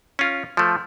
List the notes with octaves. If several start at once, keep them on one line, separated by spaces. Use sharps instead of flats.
C#4 F4
F3 A3